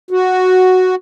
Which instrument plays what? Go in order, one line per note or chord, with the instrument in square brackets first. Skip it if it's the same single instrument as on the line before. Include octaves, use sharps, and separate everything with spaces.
[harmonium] F#4